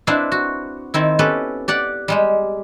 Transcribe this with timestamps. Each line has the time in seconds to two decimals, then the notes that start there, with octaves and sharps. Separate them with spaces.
0.07 C4 D4 E4 B4 F5
0.32 F#4
0.94 D#3 C4 E4
1.19 B3 C#4 G4 A4 B4
1.68 G4 D5 F#5
2.08 G3 G#3 G4